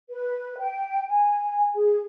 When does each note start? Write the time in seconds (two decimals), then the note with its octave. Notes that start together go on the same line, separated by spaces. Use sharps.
0.10 B4
0.59 G5
1.08 G#5
1.74 G#4